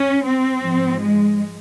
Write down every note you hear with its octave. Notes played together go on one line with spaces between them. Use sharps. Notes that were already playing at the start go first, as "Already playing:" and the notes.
Already playing: C#4
C4
G#2 F3
G#3